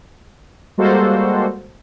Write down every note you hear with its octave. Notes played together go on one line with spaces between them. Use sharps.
G3 G#3 A#3 F#4 A4 C5